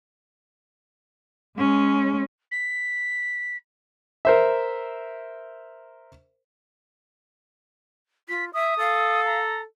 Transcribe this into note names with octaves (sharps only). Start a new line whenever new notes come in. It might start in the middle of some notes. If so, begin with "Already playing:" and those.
G#3 C#4
B6
A#4 C5 E5
F4 B6
E5 D#6
A4 F5
A#5